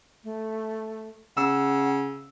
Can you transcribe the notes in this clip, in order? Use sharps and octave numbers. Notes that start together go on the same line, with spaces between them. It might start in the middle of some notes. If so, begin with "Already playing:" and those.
A3
C#3 F#5 E6